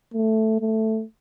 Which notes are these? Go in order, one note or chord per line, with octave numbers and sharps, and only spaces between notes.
A3
A3